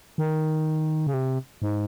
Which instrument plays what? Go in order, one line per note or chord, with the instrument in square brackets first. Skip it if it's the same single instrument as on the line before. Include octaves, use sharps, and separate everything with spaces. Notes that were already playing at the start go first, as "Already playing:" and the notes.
[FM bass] D#3
C#3
C3
G#2